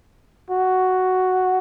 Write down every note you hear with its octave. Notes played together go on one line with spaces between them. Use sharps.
F#4